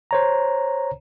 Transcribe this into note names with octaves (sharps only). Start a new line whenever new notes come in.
C5 C#5 A#5